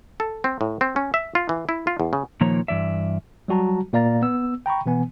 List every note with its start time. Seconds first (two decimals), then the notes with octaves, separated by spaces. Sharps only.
0.20 A4
0.44 C4
0.61 A2
0.81 C4
0.96 C#4
1.14 E5
1.35 F4
1.49 E3
1.69 E4
1.87 F4
2.00 E2
2.13 C#3
2.41 A#2 D#3 F3 A#3 C#5 A#5
2.68 G2 E3 D5 E5
3.48 F#3 G3 F#4 A5 A#5
3.93 A#2 A#3 D5 F5 A#5 A6
4.22 B3 E6
4.66 G5 A#5 B5 C#6
4.86 B2 E3 B3 G#5